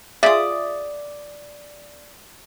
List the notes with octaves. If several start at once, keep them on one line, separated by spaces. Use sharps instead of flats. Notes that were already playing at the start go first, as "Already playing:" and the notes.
F4 G#4 D5 E5 D#6